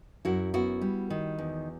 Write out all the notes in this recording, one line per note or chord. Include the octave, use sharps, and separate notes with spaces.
F#2 E4 F#4
B3 E4 F#4
G3
D#3
E2